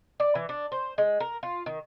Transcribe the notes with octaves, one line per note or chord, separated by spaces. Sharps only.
D5
E3
D4
C5
G#3
A#4
F4
D#3